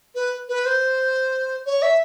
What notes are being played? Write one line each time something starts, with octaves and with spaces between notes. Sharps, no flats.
B4
B4
C5
C#5
E5